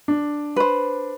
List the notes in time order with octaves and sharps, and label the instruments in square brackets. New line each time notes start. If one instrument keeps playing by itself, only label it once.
[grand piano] D4
[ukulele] B4 C5